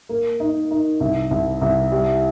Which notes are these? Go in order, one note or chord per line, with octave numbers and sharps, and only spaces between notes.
A#3
D#4
D#4
C2
C2
C2
G3